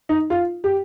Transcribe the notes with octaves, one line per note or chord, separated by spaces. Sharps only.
D#4
F4
G4